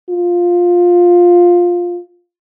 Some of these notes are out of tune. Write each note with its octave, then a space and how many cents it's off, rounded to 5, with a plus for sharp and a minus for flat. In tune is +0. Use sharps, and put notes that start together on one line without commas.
F4 +10